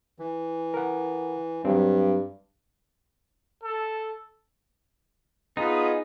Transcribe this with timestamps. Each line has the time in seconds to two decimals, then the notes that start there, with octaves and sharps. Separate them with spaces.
0.19 E3
0.74 A#4 F#5
1.65 G2 F#3 C4
3.64 A4
5.57 B3 D#4 F4 G#4